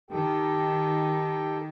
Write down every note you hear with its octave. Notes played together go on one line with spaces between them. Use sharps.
D#3 G4 A4 G5